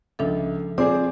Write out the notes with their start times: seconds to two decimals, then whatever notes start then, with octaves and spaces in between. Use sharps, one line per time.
0.19 C#2 F3 D4 A4 E5
0.78 C4 F4 G#4 C5 D5 D6